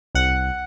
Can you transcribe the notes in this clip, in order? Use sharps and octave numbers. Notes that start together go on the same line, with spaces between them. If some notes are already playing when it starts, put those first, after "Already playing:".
C2 F#5